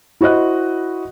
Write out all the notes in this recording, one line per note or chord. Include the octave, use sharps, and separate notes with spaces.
E4 F#4 C5 D#5 F#6